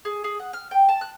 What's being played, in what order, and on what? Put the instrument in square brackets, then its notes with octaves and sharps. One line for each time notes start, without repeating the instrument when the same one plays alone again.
[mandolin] G#4
G#4
F#5
F6
G5
A5
F#6